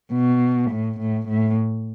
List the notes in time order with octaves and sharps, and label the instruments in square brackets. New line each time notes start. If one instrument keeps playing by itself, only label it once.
[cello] B2
A2
A2
A2